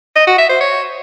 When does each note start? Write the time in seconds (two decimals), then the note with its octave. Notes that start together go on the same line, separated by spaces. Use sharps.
0.16 D#5
0.27 F#4
0.38 E5
0.49 C5
0.60 C#5